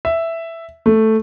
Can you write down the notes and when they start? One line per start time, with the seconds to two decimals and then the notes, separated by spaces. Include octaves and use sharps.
0.05 E5
0.86 A3